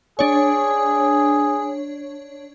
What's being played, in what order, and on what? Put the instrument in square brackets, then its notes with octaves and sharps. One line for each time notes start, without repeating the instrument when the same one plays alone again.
[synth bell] D4 C#5 [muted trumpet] G#4